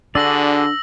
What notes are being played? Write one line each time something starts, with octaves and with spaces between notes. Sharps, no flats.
D3 D4 F#4 G#4 D5 E6 A#6 F#7